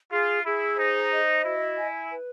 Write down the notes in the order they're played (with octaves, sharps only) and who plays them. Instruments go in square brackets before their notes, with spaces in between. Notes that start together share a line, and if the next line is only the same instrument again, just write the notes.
[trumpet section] F4 [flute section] G#4
[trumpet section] E4 [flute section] G#4
[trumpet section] D#4 [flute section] C5
[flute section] D#5
[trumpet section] E4 [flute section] F#4
[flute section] G#5
B4